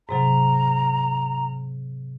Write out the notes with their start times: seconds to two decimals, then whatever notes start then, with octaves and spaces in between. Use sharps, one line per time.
0.09 G#2 C3 F#3 A#5